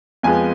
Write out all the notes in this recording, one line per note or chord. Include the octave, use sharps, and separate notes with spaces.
F2 F3 G#3 B3 G#5